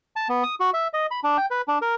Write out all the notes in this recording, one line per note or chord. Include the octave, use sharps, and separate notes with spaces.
A5
B3
D#6
F#4
E5
D#5
B5
D4
G5
B4
D4
A#4